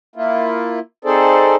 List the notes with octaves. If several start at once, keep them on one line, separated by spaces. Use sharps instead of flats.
A#3 E4 F4
C4 D#4 G#4 A4 C5 D5